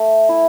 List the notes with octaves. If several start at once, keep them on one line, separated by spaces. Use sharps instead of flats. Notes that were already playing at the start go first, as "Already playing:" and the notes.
Already playing: A3 A5
E4